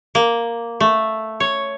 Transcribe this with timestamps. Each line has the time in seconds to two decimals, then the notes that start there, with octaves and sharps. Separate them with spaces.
0.15 A#3
0.80 A3
1.40 C#5